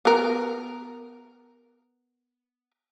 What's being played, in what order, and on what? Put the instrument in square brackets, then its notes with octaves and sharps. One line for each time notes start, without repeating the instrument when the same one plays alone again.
[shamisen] B3 A#4